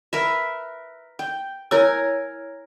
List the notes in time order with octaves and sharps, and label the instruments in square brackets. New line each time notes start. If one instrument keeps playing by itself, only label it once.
[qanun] A#4 B4 E5
G5
[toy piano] E4 C#5 E6 [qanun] A#4 G#5